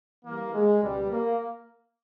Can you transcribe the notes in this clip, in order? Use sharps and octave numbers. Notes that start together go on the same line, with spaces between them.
G2 E3 A#3
G#3
C#2 B2 G3
A#3